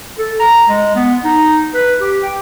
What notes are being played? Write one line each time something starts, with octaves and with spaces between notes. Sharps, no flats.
A4
A#5
G#3
B3
D#4
B4
G4
G5